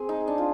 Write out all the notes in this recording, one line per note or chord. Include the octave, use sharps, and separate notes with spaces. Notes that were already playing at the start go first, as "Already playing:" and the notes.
Already playing: C4 G#4
D#4
D4
F4